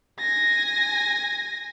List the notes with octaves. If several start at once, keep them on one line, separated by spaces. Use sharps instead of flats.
G#5 A#6